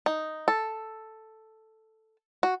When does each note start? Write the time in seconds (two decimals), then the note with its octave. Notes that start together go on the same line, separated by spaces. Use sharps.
0.06 D#4
0.48 A4
2.43 F#4